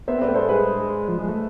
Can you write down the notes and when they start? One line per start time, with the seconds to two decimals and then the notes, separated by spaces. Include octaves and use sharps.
0.08 B3 C5 E5
0.18 C4 B4 D5
0.28 A3
0.34 G#3 A4 C5
0.48 G#3 G#4 B4
1.08 F3
1.18 G#3
1.28 A3